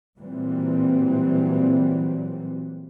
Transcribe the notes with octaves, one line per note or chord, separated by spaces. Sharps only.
A#2 E3 F#3 G3 C4